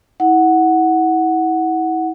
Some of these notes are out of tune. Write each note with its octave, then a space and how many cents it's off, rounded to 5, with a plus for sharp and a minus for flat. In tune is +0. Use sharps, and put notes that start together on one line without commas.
E4 -35 F#5 +0